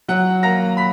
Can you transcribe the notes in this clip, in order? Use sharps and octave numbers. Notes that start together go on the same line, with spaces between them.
F#3 F#5 F#6
A#3 A#5 A#6
B5 B6